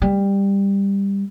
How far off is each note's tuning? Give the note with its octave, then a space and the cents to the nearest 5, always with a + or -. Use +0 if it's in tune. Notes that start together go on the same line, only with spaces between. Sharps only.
G3 +15